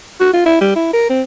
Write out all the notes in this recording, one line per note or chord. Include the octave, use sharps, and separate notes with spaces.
F#4
F4
E4
G3
E4
A#4
C4